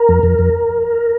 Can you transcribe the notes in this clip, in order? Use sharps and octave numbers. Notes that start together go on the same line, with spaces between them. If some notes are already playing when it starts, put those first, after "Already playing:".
Already playing: A#4
F2
F2
F2